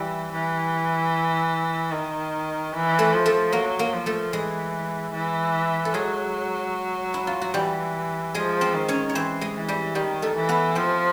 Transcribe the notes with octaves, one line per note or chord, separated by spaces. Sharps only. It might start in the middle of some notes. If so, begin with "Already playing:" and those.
Already playing: E3 G3 G4
E3
D#3
E3
A3 A4
F3
A3 A4
F#3 A#3 A#4
A#3 A#4
F3
A3 A4
E3 G#3 G#4
E3
A4
F#3 G#3 G#4
E4
F4
F#4
E3 G3 G4
F3 G#3 G#4
C4 C5
D#3
C#4 C#5
C#5
E3 C4 C5
G#3 G#4
E3
G3 G4
D#3 G3 G4
A3 A4
E3
B3 B4
F3 C4 C5